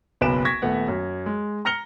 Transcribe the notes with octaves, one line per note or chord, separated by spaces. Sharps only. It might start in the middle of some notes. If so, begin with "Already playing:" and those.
F#1 B1 B4 D7 E7
C#6 G#6 A#6 B6
D#1 A3 B3 F#5
F#2
G#3
A#5 F6 A#6 C#7 F7 G7